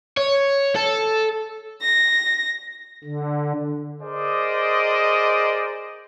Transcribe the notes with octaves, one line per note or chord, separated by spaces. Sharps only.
C#5
A4
A#6
D3
G#4 A#4 C5 D5 D#5